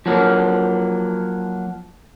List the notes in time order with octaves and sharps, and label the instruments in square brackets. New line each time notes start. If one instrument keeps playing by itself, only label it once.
[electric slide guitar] F3 F#3 A#3